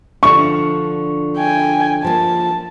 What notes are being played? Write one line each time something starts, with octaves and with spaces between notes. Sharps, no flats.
D3 F3 D4 C#6
G5 G#5
F3 A#3 A5